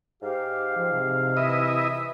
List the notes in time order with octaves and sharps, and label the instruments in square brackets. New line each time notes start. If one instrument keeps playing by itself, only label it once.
[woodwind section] G#2 F5 [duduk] G4
[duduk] F3
C3
[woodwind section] E3 E5 [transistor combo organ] E4 D#5